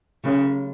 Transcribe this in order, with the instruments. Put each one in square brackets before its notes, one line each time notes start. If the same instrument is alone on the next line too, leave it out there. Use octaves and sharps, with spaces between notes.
[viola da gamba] C#3 [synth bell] F#3 A3 C#4 G4 C#5